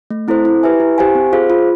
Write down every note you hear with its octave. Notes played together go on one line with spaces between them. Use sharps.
A3
C4 E4 A4 C5
E4
G4 B4 E5 G#5
E4
G4 C5 F5 G#5
C4
F4 G#4 C5 F5
F4